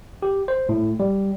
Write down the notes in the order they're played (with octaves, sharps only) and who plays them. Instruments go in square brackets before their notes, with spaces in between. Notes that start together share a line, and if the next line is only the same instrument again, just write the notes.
[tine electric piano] G4
C5
A2
G3